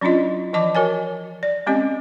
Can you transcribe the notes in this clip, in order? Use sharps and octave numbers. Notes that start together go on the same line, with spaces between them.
F#3 C#4 D4 E4 F4 D#5
E3 F3 D5 D#5 A5 D6
F#4 A#4 C#5 G#5
D5
G#3 C4 C#4 G4 D#5